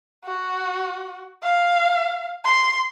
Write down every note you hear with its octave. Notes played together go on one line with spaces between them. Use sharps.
F#4
F5
C6